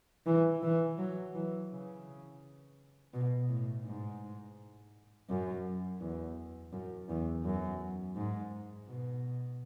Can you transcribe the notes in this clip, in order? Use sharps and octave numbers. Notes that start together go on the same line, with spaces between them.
E3
E3
F#3
E3
C#3
B2
A2
G#2
F#2
E2
F#2
E2
F#2
G#2
B2